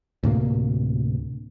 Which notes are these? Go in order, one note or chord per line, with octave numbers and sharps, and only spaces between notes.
D2 A2 C3 A#3